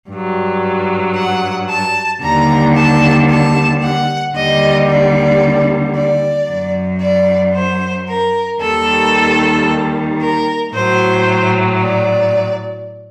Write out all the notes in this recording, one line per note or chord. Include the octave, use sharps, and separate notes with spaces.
G2 F#3
F#5
A5
D#2 D3 G3 A#5
A5
A5
F#5
D#2 D3 G3 D#5
D5
D5
F#2 F#3
D5
C5
A#4
D#2 D#3 G3 A4
A#4
A2 F#3 C5
D5